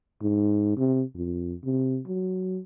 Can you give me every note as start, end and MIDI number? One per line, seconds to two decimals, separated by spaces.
0.22 0.72 44
0.77 1.02 48
1.15 1.54 41
1.64 2.00 48
2.07 2.60 54